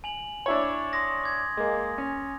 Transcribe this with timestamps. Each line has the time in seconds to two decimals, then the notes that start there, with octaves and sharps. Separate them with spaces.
0.04 G#5 F7 F#7
0.46 D4 E4 C#5
0.93 C6 D#6 A#6
1.23 D6 G#6
1.57 G#3 A#3
1.98 C#4